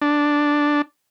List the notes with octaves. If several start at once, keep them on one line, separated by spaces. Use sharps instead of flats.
D4